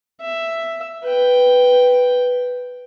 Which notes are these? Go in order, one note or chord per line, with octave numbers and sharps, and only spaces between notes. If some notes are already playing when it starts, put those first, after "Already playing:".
E5
B4 G5